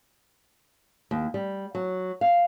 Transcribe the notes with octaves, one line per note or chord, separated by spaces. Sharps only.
D#2
G3
F#3
F5